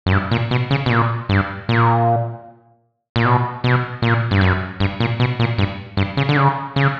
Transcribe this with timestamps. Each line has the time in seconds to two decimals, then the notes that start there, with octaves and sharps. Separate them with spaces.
0.06 F#2
0.12 G2
0.31 A#2
0.51 B2
0.71 C#3
0.86 B2
0.90 A#2
1.29 G2
1.69 A#2
3.16 A#2
3.25 B2
3.64 B2
4.02 A#2
4.31 G2
4.41 F#2
4.80 G2
5.00 A#2
5.20 B2
5.40 A#2
5.58 G2
5.97 G2
6.17 C#3
6.29 D3
6.37 C#3
6.76 C#3